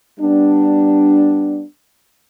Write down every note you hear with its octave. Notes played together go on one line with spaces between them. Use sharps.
G3 B3 D4